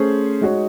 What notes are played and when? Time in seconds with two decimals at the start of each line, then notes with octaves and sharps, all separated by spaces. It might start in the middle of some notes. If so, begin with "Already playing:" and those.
Already playing: A3 C#4 G#4 C5
0.41 G#3 D#4 F#4 C#5